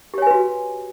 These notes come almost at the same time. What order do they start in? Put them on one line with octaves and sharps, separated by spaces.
G4 C#5 G#5 B4 F#4